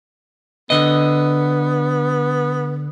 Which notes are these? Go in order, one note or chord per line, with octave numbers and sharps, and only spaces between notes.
D3 B3 D#5